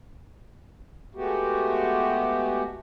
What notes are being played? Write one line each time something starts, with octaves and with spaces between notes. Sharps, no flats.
G#3 A3 B3 F#4 G4